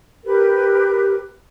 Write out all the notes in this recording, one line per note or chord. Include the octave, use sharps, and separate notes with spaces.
G4 A#4 B4